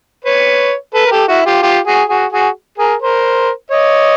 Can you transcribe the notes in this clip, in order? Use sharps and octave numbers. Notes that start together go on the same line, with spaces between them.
B4 C#5
A4 B4
A#4
G4 A4
E4 F#4
F4 G4
F4 G4
F#4 G#4
F#4 G#4
F#4 G#4
G#4 A#4
A#4 C5
C#5 D#5